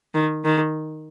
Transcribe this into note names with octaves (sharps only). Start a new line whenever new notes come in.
D#3
D#3